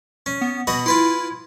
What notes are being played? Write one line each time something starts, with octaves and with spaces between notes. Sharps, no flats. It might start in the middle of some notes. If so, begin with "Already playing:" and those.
C#4
B3
B2 F#4 D#5 B5
E4 F4 B4 C6